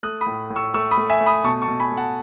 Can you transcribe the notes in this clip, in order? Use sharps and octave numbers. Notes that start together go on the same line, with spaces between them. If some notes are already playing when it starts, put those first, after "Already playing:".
A3 D#6 F#6
B5 D#6
A2
A2
C#6 E6
A3 C#6 E6
B5 D#6
A3
E5 G#5
A3
B5 D#6
B2 A5 C#6
A5 C#6
B2
G#5 B5
A3
F#5 A5